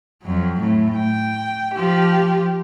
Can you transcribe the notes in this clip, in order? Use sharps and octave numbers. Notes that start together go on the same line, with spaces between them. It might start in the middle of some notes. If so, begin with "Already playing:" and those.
F2 F#3
A2
G5
F3 G4